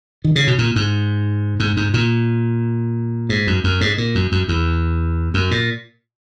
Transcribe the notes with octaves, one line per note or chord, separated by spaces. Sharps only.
D#3
C#3
B2
A#2
G#2
G#2
G#2
A#2
G#2
F#2
F#2
G#2
A#2
F#2
F#2
E2
F#2
A#2